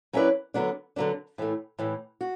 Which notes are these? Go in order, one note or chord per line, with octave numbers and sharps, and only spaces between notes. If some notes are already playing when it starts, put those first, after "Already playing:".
F#3 C#4 E4 B4 D5
D3 F#3 B3 D4
D3 F#3 B3 D4
A2 E3 A3
A2 E3 A3
F#4